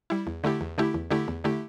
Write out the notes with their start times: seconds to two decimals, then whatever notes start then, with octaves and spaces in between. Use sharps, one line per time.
0.10 G3 E4
0.27 E2
0.44 D3 A3 E4 G4
0.61 E2
0.78 D3 A3 E4 G4
0.94 E2
1.11 D3 A3 E4 G4
1.28 E2
1.44 D3 A3 E4 G4